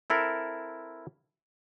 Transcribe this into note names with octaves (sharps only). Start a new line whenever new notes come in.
C4 E4 A4 A#4